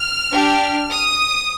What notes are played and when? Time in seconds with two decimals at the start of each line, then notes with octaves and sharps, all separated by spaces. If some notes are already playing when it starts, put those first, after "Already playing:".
Already playing: F6
0.32 D4 G4
0.91 D#6